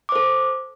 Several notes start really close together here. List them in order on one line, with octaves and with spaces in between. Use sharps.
D6 C5 A4